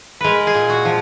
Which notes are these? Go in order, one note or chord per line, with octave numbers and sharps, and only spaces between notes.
G#3 A#4 B4
G#4
A#2
F#4
F3